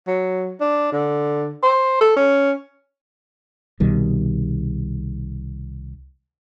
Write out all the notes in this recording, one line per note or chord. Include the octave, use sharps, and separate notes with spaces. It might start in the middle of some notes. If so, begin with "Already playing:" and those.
F#3
D4
D3
C5
A4
C#4
C2 B2 D#3 G3